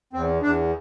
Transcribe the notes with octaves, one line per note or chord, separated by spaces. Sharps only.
E2 C4
E2 D4